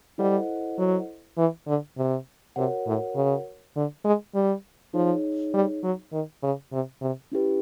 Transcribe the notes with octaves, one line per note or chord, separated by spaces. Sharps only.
G3 E4 A4 C5 D#5 F#5
F#3
E3
D3
C3
C3 F#4 A#4 C#5 F#5
A2
C#3
D3
G#3
G3
F3 D#4 G#4 C#5
G3
F#3
D#3
C#3
C3
C3
C#4 E4 G4 B4